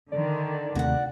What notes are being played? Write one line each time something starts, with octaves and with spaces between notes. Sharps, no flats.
D3 D#3 D5
D#2 C3 A3 F#4 F#5